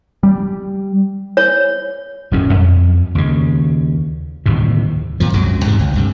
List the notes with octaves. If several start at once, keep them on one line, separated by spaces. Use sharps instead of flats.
G3
C#5
D#1 F#2 F#3 C#4
F2
D#2 C#3
D1 D#2 A2 C3
D#2 A#2 F3
C2 F#2 F#3 G#3
E2 G#2 C3 D#3
C#2
D2 G2 C3